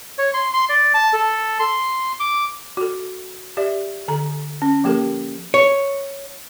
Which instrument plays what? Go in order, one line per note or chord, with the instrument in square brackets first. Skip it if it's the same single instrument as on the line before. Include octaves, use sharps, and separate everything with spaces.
[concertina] C#5
C6
C6
D5
A5
A4
C6
D6
[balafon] F#4 A4
G4 D5 E5
D3 A4 A#5
C#4
F3 A#3 G4 A4 A#4
[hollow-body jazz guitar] C#5